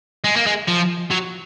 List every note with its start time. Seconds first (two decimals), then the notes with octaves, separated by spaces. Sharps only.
0.24 G#3
0.36 A#3
0.47 G#3
0.68 F3
1.11 F#3